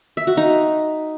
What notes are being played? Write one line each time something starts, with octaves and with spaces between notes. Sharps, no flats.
E5
F#4
D#4